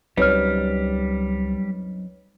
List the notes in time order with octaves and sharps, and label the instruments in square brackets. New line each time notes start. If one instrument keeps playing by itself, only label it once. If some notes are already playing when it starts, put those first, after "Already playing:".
[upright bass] C#2 [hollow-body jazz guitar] F#2 C4 D#4 [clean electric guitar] G3 [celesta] B4 C#5 F6